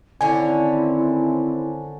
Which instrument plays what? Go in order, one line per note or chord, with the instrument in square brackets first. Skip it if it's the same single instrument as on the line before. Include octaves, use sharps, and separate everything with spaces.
[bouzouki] D3 C#4 [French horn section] D#3 C4 [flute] E4 [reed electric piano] G#5